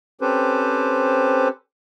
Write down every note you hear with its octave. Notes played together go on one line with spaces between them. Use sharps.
C4 C#4 G4 A4 B4 C5